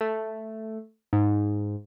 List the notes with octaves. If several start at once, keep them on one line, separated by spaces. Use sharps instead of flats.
A3
G#2